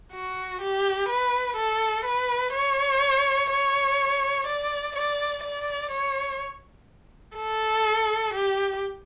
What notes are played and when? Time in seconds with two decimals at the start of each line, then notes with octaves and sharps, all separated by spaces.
0.13 F#4
0.61 G4
1.09 B4
1.56 A4
2.05 B4
2.53 C#5
3.50 C#5
4.46 D5
4.95 D5
5.43 D5
5.91 C#5
7.36 A4
8.33 G4